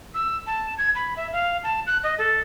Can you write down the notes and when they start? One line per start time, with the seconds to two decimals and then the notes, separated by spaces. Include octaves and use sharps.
0.14 E6
0.47 A5
0.78 G#6
0.95 B5
1.17 E5
1.33 F5
1.63 A5
1.87 F#6
2.03 D#5
2.18 A4